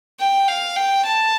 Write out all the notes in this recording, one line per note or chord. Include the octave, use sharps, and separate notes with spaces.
G5
F5
G5
A5